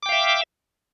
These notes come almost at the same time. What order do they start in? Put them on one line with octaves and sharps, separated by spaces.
D6 G5 F5 E5